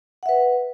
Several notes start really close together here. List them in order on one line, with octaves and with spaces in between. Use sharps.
F#5 E5 B4